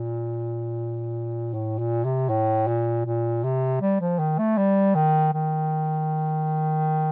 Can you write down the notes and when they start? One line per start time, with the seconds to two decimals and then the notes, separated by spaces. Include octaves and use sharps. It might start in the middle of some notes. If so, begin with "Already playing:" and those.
Already playing: A#2
1.54 A2
1.79 A#2
2.05 C3
2.29 A2
2.67 A#2
3.05 A#2
3.44 C3
3.81 G3
4.01 F3
4.19 D#3
4.39 A3
4.57 G3
4.95 D#3
5.33 D#3